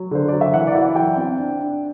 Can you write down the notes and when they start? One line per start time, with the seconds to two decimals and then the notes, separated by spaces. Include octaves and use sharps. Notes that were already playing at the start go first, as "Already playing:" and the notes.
Already playing: F#3
0.11 D3 C5
0.28 F#3 D5
0.41 E5
0.54 E3 F#5
0.67 D5
0.75 E4
0.82 F#5
0.95 F#3 G5
1.17 C4
1.38 D4
1.59 D4